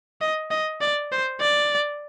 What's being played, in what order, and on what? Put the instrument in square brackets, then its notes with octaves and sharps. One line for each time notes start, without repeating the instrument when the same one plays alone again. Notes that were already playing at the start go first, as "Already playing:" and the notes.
[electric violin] D#5
D#5
D5
C5
D5